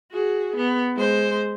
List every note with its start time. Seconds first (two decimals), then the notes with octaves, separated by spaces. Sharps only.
0.11 F#4 G#4
0.56 B3
0.95 G#3 C5